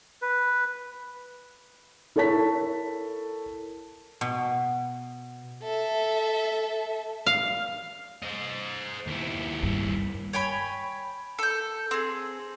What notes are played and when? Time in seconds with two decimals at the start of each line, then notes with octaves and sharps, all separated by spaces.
0.22 B4
2.16 E4 A4 A#4 C#5 A5 B6
4.21 B2
5.63 A4 E5
7.26 F5
8.22 C5 D#5
9.07 D#2 E4
9.63 G2
10.33 C#5 G5 G#5 B5
11.39 A4 G6
11.91 C4 G#4